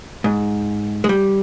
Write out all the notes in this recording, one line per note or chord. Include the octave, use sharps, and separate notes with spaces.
G#2
G#3
G3